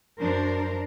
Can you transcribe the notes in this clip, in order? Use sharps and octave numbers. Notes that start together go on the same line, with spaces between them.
F#2 D4 A#4 C5